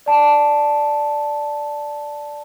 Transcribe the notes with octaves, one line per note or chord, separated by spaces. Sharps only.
D5 A5